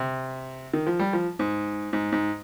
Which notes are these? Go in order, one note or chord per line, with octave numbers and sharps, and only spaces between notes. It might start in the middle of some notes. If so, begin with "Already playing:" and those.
Already playing: C3
D#3
F3
G3
F3
G#2
G#2
G#2